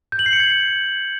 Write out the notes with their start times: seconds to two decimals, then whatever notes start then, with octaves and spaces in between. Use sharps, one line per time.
0.12 G6
0.19 F#7
0.26 C7
0.33 C#7
0.40 G#6